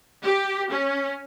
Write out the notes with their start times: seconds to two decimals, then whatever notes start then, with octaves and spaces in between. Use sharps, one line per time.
0.23 G4
0.70 C#4